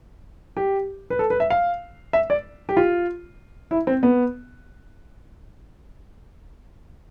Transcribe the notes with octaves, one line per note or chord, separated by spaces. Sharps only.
G4
B4
A4
B4
E5
F5
E5
D5
G4
F4
E4
C4
B3